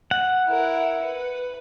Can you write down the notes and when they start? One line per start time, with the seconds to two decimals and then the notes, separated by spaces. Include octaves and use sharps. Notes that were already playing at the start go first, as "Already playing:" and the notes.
0.11 F#5
0.47 E4 A#4
1.03 B4